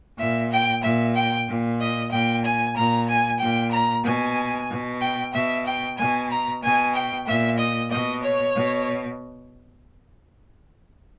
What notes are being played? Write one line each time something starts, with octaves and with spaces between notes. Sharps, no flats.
A#2 E5
G5
A#2 E5
G5
A#2
D#5
A#2 G5
G#5
A#2 A#5
G#5
A#2 G5
A#5
B2 G#5
B2
G5
B2 E5
G5
B2 G#5
A#5
B2 G#5
G5
A#2 E5
D#5
B2 D#5
C#5
B2